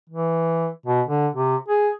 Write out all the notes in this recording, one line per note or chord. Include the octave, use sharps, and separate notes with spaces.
E3
B2
D3
C3
G#4